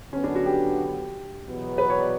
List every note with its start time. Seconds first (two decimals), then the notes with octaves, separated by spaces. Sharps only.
0.13 D3 F#3 B3 C#4
0.24 D4
0.35 F#4
0.46 G4
1.45 E2 B2 F#3 B3
1.78 B4
1.90 C#5
2.00 D5